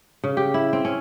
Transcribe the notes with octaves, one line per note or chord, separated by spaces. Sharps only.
C#3
G4
E4
C4
C#4